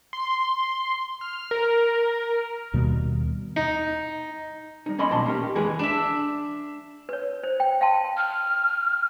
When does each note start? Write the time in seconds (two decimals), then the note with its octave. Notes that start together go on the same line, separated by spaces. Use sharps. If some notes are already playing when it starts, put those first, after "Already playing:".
0.13 C6
1.21 F6
1.51 A#4
2.73 D#2 B2 G3 A#3
3.57 D#4
4.86 G3 D#4
4.98 A#3 C#4 D#5 B5 C6
5.11 B1 A#2 F3 A5 C6
5.26 A#3 C#4 G4 A#4
5.43 G4
5.55 E3 G#3 G#4 B4
5.79 D4 E5
7.09 B4 C#5
7.43 C5
7.60 G5
7.81 F5 G5 A5 C6
8.17 F6